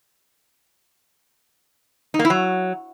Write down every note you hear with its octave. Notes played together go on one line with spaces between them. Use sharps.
D#4
A#3
E4
F#3